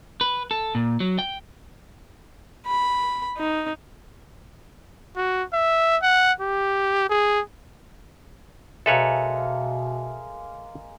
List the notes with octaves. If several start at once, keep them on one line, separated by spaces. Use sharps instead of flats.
B4
A4
A#2
F#3
G5
B5
D#4
F#4
E5
F#5
G4
G#4
B2 G#3 A#3 A4 B4 C#5 E5 F5